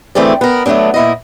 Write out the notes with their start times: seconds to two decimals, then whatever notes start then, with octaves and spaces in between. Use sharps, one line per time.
0.15 D2 E3 A3 C4 G#4 D5
0.41 B3 A#4
0.66 F#3 A3 B3 C4 D4
0.94 A#2 E4 D#5